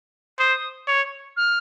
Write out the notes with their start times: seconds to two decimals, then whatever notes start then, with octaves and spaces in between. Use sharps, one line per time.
0.39 C5 D#6
0.88 C#5
1.36 F6